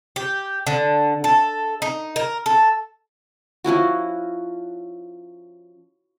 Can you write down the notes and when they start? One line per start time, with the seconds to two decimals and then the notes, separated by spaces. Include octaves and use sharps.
0.16 G4
0.67 D3
1.24 A4
1.82 D#4
2.16 A#4
2.46 A4
3.64 F3 C#4 E4 F#4